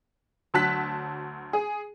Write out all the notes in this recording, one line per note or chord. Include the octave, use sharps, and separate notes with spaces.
D2 F#3 A5 F#6 B6
G#4